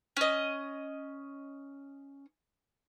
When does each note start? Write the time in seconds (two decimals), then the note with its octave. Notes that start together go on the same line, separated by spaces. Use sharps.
0.17 C#4 D#5